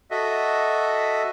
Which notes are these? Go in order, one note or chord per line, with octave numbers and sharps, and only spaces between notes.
F#4 A4 D#5 E5